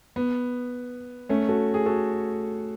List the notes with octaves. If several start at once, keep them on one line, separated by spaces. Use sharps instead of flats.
B3
A3 C#4
F#4 A4
G#4
F#4 A4